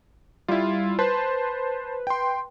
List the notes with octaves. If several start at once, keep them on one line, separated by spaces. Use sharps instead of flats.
G3 E4 F4
B4 C5 A5 C6
G5 C6